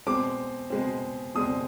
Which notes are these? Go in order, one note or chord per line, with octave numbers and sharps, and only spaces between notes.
B2 G#3 C4 D6
B2 G#3 C4
B2 G#3 C4 D#6